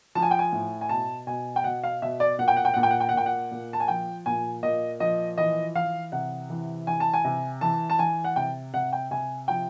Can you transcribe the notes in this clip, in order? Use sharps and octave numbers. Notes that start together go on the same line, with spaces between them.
F3 A5
G#5
G5
G#5
A2
G#5
B2 A5
B2 G#5
G5
B2 F#5
F5
B2 E5
D5
A#2 F#5
G5
F#5
G5
A#2 F#5
G5
F#5
G5
F#5
A#2 G5
F#5
A#2
A5
G#5
F3 G5
A#2 G#5
A#2 D#5
F3 D#5
E3 D#5
E3 F5
C3 F#5
E3
E3 G#5
A5
G#5
C3
E3 A5
A5
E3 G#5
F#5
C3 G5
C3 F#5
G5
C3 G#5
F3 G5